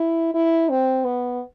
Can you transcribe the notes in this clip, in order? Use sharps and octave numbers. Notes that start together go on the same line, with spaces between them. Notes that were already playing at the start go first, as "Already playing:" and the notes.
Already playing: E4
E4
C4
B3